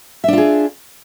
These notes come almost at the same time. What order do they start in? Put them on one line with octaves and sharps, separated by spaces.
E5 D4 F4 G#4